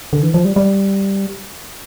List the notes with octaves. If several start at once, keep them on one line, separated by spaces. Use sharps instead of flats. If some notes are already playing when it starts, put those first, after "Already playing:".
D3
E3
F3
G3
G3